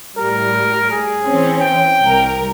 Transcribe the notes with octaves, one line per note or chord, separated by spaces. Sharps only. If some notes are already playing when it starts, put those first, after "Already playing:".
A2 G3 A#4
G#4
E3 C4 C#4
G5
C2 A#4